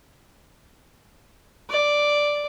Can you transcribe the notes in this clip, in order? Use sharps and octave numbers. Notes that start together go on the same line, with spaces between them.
D5